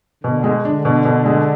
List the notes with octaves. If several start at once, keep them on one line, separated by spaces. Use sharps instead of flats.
B2 D3
G#3
D3 D4
B2
B2
G#3